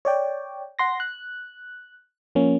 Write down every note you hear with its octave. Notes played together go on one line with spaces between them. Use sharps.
C#5 D5 G5
F#5 C6 A#6
F#6
F3 A#3 C#4